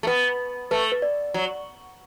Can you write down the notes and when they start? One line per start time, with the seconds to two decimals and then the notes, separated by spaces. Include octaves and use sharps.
0.03 A3
0.07 B3 B4
0.71 A3 B4
0.92 B4
1.02 D5
1.34 F#3